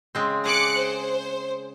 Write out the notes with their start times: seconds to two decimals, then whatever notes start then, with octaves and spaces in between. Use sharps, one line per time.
0.15 C#3 G#3 C4
0.45 G#4 D6 F#6 C#7
0.77 C5